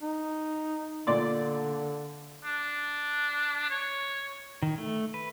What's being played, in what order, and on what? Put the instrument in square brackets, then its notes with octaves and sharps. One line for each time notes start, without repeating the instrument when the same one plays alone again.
[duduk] D#4
[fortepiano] A#2 D5 C6 [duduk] D3
[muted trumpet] D4
C#5
[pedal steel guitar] D#3
A3
B4